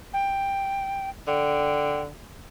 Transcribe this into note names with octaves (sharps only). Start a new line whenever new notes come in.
G5
D3 G5